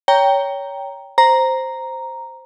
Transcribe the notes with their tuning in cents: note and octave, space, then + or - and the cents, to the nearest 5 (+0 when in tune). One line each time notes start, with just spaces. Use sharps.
C#5 +20 G5 +0 A#5 +0
C5 +0 A#5 +0